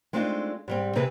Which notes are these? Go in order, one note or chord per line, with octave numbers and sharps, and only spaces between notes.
G#3 A3 C4 D4 D#4 F4
G#2 G3 C4
C3 E3 G#4 B4